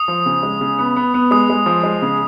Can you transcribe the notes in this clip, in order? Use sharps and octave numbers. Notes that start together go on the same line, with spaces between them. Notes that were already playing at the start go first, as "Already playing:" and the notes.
Already playing: D#6
F3
C#3
G#3
C#3
B3
B3
B3
G#3 D#6
G#3
F3
G#3
C#3